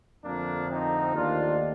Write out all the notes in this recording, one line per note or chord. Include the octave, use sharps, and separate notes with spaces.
F2 D3 F3 A3 A#3 D4
C4 D#4
D#2 D#3 A3 D4 F4